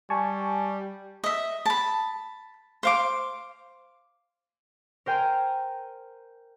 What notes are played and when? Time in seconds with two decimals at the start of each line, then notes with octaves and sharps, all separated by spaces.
0.10 G3 G#5 A5 C#6
1.24 D#5 E5
1.66 A5 B5
2.83 C5 F5 D6
5.06 A#4 C5 G5 G#5 A#5